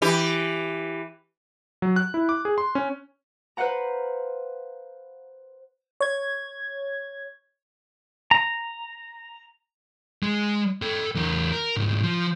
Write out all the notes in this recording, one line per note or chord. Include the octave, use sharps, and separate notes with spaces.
E3 G4
F#3
F#6
E4
D6
G#4
C6
C#4
B4 C5 F5 F#5 A#5
C#5 G#6
A#5
G#3
A4 G5
E2 A#4
A#4
C2 G#2
F3